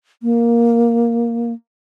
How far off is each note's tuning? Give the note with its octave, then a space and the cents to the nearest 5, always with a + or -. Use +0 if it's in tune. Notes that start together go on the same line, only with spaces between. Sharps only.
A#3 +5